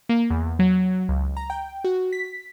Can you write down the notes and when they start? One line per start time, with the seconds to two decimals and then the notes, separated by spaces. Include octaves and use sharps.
0.09 A#3
0.30 E2
0.59 F#3
1.09 C#2
1.37 A#5
1.50 G5
1.84 F#4
2.13 B6